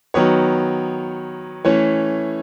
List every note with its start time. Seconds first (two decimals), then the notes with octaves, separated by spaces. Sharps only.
0.14 D#3 F#3 B3 C#5
1.65 E3 A3 C#4 C#5